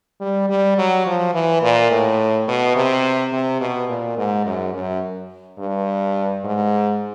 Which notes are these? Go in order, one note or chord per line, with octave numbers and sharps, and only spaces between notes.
G3
G3
F#3
F3
E3
A#2
A2
B2
C3
C3
B2
A#2
G#2
F#2
F#2
G2
G#2